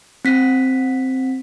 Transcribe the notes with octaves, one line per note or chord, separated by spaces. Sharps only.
C4 B6